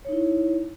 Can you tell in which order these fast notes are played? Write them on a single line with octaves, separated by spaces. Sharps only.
C#5 D#4 E4